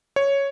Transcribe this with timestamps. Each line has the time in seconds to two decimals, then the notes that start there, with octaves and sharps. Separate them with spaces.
0.16 C#5